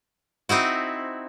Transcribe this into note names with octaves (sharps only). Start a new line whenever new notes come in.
C4 D#4 E4 F#4